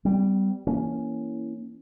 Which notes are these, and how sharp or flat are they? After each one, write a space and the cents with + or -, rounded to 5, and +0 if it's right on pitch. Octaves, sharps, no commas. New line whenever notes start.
G3 -10 B3 +45
E3 +0 A#3 +0 C#4 +0